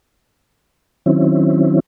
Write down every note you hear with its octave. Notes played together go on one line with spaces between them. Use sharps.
D#3 F#3 C4 C#4 E4